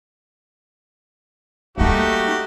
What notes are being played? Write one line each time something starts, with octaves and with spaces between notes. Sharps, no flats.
G3 A3 A#3 D#4 F#4 G4